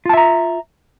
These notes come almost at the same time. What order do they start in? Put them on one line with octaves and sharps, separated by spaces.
F4 A5 E5 A#5